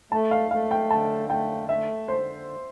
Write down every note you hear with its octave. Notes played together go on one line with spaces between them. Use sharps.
A3 A5
F5
A3 F5
G5
D3 A5
A3 G5
A3 E5
D3 C5